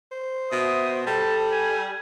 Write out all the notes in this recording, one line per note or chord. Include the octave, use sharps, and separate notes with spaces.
C5
B2 E5 D#6
G3 A4 A5
G#5